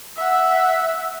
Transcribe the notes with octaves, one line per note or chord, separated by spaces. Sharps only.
E5 F#5